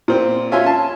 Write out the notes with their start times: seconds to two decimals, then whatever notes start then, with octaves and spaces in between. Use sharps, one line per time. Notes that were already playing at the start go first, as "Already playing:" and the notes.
0.08 A#2 C4
0.51 C#4 F4 E5 G#5 C6
0.66 A5